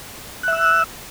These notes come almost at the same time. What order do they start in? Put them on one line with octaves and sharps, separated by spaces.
F#6 E5 E6